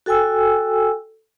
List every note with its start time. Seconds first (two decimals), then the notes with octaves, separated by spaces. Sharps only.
0.06 F#4 A4 G5 G#5 E6